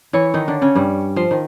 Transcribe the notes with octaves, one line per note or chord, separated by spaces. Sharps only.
E3 E4 C#5
D#3 D#4
D3 D4
C#3 C#4
G2 G3
F3 C5
D#3